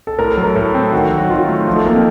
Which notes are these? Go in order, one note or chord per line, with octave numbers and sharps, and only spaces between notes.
A4
A2 A#4
A4
F#3
A#4
A2 A4
C4
D#3 F#4
F#3
F#4
D#3 F4
A3
F3 D#4
A4
A#3 A#4
C4